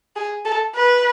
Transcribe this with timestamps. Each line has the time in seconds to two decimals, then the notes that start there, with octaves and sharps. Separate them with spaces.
0.16 G#4
0.45 A4
0.75 B4